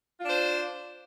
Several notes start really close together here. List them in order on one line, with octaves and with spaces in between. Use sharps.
F4 D4 C5